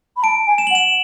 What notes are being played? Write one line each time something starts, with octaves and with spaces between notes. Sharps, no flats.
B5
A5 D7
G#5
E7
F#7
F#5
E7